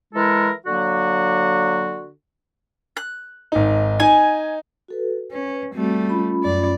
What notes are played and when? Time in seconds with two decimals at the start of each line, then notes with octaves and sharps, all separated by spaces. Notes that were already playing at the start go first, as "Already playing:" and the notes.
0.14 E3 G#3 E4 A4 A#4
0.66 D3 F#3 A#3 F#4
2.97 F#6
3.52 G#1 D#4
4.00 D#4 G#5
4.88 F#4 A4 B4
5.32 C#4 B4
5.75 G3 A3 C4 F#4
6.09 C#4 F4 B5
6.44 F#2 D5